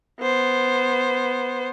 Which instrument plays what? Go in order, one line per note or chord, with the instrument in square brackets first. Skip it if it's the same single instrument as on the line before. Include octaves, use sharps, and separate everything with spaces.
[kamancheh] B3 C5